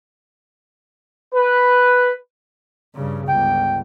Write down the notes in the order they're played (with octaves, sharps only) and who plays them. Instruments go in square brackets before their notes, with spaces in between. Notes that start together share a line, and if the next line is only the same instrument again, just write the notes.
[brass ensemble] B4
[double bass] G2 C#3
[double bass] G1 C#2 [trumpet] G5